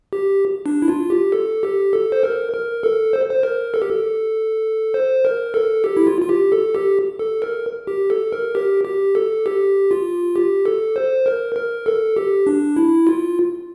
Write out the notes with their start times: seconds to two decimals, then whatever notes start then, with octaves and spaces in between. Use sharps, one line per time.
0.13 G4
0.66 D4
0.82 E4
0.88 F4
1.10 G4
1.32 A4
1.63 G4
1.93 A4
2.12 C5
2.23 A#4
2.54 A#4
2.83 A4
3.13 C5
3.30 C5
3.43 A#4
3.74 A4
3.82 G4
3.90 A4
4.94 C5
5.25 A#4
5.54 A4
5.84 G4
5.97 E4
6.07 F4
6.22 F4
6.29 G4
6.52 A4
6.75 G4
7.19 A4
7.42 A#4
7.87 G4
8.10 A4
8.32 A#4
8.55 G4
8.85 G4
9.15 A4
9.46 G4
9.91 F4
10.36 G4
10.66 A4
10.96 C5
11.26 A#4
11.56 A#4
11.86 A4
12.17 G4
12.47 D4
12.76 E4
13.07 F4